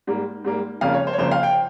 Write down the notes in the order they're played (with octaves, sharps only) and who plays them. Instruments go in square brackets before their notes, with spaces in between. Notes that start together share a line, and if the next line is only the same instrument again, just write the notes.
[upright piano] G#2 G3 A#3
G#2 G3 A#3
F2 C#3 F3 A#3 C#4 F5
C#5
C5
C#5
F2 C#3 F3 A#3 C#4 C5
F5
G5